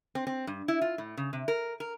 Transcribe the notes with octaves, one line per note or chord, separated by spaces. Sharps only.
C4
C4
G2
E4
F4
A2
C#3
C3
A#4
A#4